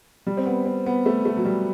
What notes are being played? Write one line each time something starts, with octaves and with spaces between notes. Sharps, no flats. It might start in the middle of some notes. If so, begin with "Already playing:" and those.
G3
C4
B3
C4
B3
A3
A3
F#3
G3